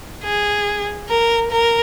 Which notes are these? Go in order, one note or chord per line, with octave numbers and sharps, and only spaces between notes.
G#4
A#4
A#4